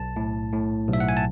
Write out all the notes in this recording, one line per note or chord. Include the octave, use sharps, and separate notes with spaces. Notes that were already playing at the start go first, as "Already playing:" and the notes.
Already playing: B1 A5
A2
A2
B1
E5
F#5
G#5
A5